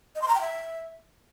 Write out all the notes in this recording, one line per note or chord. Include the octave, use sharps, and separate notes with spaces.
D#5
C6
A#5
G5
E5